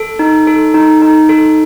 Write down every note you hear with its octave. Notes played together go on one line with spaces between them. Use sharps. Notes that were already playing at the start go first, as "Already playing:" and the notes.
Already playing: A4
D#4
A4
D#4
D#4
A4